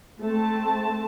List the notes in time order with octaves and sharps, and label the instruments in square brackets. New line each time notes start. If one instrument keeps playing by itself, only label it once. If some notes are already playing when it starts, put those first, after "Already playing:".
[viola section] A3 C4 A5